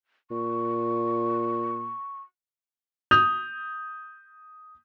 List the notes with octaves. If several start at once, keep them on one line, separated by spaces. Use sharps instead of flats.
A#2 C#6
D#6 G6 F7